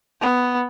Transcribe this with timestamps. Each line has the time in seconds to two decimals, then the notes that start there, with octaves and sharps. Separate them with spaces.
0.21 B3